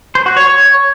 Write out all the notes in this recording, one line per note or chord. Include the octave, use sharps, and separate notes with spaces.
C5
F#4
C#5
C#5